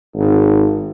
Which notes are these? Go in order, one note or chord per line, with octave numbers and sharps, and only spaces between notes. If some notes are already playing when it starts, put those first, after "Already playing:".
G#1